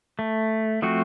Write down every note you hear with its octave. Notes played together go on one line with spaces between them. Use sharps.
A3
F3 A3 C4 F#4